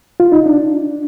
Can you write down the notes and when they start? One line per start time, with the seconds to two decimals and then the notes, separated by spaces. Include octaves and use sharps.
0.20 F4
0.32 D#4
0.46 D4